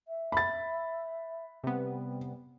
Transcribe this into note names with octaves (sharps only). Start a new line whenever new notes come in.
E5
B5 A6
C3 G3 B3